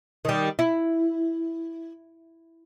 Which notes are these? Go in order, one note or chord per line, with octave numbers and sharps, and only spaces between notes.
D#3 G3
E4